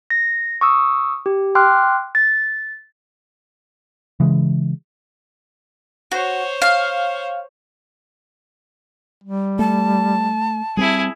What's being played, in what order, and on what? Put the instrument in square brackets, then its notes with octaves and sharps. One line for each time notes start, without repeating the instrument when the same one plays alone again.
[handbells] A#6
C#6 D#6 E6
G4
G5 C6 D6 F6 F#6
A6
[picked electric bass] C#3 E3 G#3
[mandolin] F#4 [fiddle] C5 C#5
[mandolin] F5
[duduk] G3
[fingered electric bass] A3 [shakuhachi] A5
[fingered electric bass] G3 B3 C4 [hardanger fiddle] E4 G#4